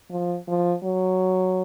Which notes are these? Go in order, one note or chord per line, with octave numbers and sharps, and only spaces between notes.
F3
F3
F#3